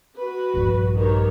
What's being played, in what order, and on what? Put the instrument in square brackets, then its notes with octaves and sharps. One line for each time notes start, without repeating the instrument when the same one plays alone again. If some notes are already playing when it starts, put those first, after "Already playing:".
[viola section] F#4 B4
[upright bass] A#1 G2
[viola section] D#3 G4 C#5